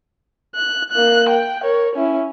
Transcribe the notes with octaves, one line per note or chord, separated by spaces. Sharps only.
F#6
A#3 F#6
G5
A#4 C#5
C#4 E4